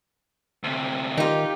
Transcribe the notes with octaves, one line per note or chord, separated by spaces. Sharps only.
D2 C3
D#3 D#4 F4 G4